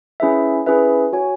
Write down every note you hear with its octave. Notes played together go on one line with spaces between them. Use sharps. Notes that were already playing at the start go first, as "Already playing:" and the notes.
C#4 E4 G#4 B4 E5
C#4 E4 G#4 B4 E5
F#4 C#5 G#5